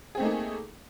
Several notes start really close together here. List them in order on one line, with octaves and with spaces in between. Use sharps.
G#4 C4 A3 D#4 A#3